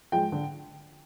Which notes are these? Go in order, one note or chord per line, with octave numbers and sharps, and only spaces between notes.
F3 G#3 G5
D3